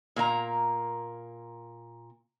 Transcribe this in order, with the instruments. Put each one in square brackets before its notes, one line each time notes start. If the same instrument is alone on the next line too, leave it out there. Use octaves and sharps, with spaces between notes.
[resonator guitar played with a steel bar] A#2 A#3 E4 A#5